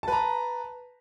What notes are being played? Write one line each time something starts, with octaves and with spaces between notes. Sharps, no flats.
B4 A5 A#5